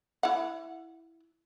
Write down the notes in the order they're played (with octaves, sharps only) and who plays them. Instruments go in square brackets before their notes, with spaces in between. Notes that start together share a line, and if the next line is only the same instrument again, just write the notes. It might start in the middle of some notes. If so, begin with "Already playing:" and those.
[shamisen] E4 F#5